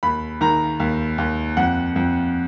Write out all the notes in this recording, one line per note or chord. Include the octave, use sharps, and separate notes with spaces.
D#2 B5
D#3 A#5
D#2
D#2
F2 F#5
F2